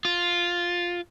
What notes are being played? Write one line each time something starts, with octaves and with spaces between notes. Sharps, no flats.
F4